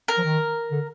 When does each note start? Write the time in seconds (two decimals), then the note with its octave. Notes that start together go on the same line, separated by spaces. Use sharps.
0.08 A#4
0.18 F3
0.24 D#3
0.72 D3